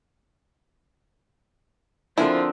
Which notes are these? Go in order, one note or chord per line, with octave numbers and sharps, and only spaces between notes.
D3 F3 C4 D4 E4 A#4 G#5